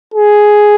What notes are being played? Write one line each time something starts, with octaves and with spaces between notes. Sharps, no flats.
G#4